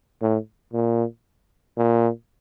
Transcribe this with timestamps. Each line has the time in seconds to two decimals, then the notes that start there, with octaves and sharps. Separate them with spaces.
0.22 A2
0.73 A#2
1.77 A#2